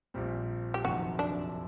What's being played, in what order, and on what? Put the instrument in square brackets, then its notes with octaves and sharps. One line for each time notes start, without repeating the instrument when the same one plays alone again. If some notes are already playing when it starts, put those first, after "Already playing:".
[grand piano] A#1 A#2 G3 C4
[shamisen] G4
[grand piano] F#1 F2 C3 D#3 F#3 [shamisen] F#4
[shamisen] D4